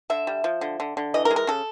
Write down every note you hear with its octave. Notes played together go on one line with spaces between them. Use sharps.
D3 E5
G3
F3
D3
D3
D3
E3 D#5
A#4
G#3
A#4
C#3 A4